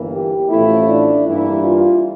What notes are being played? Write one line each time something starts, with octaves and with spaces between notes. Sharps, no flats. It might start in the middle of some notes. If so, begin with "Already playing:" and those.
Already playing: G1 G2 E3 A#3
G4
A1 A2 F3 A3 E4
D4
G2 E3 G3 A#3 E4
F4